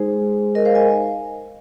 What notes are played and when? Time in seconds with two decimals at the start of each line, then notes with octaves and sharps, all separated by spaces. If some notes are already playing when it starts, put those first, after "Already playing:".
Already playing: G#3 D#4 G#4 C5
0.55 A#4 D#5
0.65 C5 F5
0.75 D#5 G#5